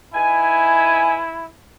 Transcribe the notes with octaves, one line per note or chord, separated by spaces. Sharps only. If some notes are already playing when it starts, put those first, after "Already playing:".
D#4 E4 B4 G#5